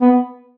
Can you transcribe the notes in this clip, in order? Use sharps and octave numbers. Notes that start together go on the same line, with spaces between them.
B3